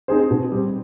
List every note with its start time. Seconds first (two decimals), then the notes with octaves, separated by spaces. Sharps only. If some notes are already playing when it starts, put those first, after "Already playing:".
0.08 C4 D#4 G#4 C5
0.31 B2
0.52 G3 C4